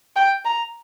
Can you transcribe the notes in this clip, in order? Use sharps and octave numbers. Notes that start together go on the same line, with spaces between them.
G5
A#5